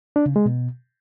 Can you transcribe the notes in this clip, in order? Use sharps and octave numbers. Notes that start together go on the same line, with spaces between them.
D4
C#3
G#3
B2